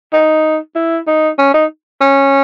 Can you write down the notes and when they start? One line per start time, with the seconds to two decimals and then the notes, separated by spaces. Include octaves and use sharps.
0.13 D#4
0.76 E4
1.07 D#4
1.38 C#4
1.54 D#4
2.01 C#4